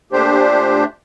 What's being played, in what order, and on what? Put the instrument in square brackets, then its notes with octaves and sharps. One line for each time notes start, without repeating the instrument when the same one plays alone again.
[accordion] A#2 A3 D4 G4 C5